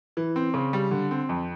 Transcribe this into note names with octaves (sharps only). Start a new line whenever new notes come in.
E3
C4
C#3
G3
D3
C4
F2